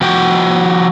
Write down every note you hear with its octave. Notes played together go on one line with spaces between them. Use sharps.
F3 F#4 G5